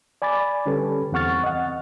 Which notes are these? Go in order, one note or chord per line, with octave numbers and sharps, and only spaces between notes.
D5 G#5 B5 D6 A6
D3 G3 C#4 G4 A4 B4
E2 C4 F#5 C#6 F6 A6
D#5 F#5